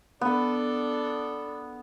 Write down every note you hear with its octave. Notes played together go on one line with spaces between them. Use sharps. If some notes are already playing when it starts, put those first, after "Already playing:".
B3 D4 A4